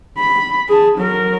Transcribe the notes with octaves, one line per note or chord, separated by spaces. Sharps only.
B5
G#4 A5
F#3 A#4